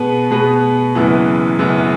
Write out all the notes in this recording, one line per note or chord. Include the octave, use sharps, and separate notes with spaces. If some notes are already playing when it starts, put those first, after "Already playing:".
Already playing: B2 B3 G#4 B4
B2 B3 G#4 B4
F#1 F#2 E3 B3
F#1 F#2 E3 B3